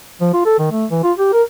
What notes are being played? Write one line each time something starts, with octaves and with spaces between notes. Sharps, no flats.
F3
F4
A4
D#3
A3
E3
F4
G4
A#4